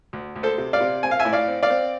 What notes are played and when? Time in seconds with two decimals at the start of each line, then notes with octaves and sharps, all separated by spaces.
0.13 D2
0.36 D2
0.43 A4 C5
0.58 C3
0.73 D5 F5
0.81 C3
1.03 C4 G#5
1.11 F5
1.19 E5 G#5
1.25 A2
1.33 D5 F5
1.48 C4
1.63 D5 F5
1.70 C4